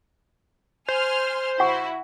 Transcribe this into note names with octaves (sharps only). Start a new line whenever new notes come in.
C5 G#5 C6 F6
E4 F#4 F#5 C#6